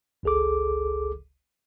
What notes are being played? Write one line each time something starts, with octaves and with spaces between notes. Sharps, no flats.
G1 C#2 G#4 A4 D6